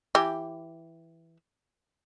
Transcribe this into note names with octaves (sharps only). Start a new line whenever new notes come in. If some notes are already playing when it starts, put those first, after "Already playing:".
E3 G4